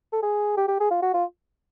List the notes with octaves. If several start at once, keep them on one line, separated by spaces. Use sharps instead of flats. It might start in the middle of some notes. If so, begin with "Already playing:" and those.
A4
G#4
G4
G4
G#4
F4
F#4
F4